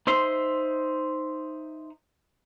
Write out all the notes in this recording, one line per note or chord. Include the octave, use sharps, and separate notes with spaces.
D#4 C5 E5 C6